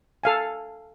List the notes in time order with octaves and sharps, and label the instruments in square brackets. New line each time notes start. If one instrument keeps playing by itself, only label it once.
[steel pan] A4 F5 G#5